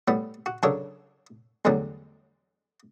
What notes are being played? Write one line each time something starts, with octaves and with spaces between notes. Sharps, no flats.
A2 G3 B3
F#4
C#3 F#3 D4 A4 A#4 C#5
E2 A2 D3 F#3 G3